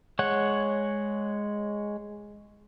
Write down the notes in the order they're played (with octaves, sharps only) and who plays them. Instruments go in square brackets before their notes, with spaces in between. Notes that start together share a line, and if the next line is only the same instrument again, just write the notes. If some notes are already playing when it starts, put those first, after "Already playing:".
[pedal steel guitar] G#3 C#5 F#5